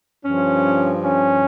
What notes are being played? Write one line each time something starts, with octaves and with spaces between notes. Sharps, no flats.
G2 F3 C#4
C#4